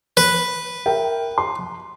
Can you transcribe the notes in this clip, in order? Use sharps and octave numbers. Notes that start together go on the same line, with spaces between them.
B4
A#4 E5 G5
C6